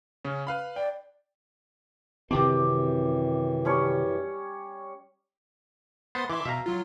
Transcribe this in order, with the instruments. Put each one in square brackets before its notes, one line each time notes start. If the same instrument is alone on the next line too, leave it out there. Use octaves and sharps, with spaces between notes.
[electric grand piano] C#3 C#4
B4 F5 B5
[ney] D5 [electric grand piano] G5
[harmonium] F#2 E3 [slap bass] C3 D#3 C4 [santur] G4 D6
[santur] G3 C#4 C#5
[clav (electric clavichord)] B3 C5 [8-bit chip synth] C6 D#6 A6
[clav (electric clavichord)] E3 [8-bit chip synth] E5 C6 D6
[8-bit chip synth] B2 [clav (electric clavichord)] E5 F5 A#5
[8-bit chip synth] F#3 F4